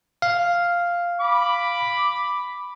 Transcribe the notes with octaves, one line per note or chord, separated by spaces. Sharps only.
F5
B5 D6